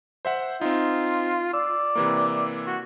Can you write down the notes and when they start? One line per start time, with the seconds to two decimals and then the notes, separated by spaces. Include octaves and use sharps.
0.25 C5 E5 F#5
0.61 C4 D#4 F4
1.54 D5 E6
1.95 C3 E3 A#3
2.66 F#4